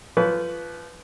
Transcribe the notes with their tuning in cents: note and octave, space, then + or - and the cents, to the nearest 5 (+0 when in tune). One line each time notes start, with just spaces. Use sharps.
F3 -25 B4 +0 C#6 +40